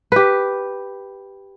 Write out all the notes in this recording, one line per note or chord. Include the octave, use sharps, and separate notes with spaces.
G4 B4